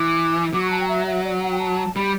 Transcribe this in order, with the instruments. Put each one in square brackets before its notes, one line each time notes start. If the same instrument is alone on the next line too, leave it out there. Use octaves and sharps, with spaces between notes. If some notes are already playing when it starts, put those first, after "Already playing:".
Already playing: [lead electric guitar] E3 [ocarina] D6
[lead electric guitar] F#3 [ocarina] D6
[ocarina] C#6
A5
G5
E5
E5
D5
F#5
G5
A5
[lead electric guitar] G3 [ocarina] B5